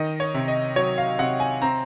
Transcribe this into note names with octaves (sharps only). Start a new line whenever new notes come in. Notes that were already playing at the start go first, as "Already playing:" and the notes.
Already playing: D#3 D#5
C#5
C3
D#5
F#3 C#5
F5
C3 F#5
G#5
C4 A#5